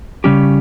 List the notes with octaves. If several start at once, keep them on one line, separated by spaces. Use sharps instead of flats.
C#3 G3 C#4 G4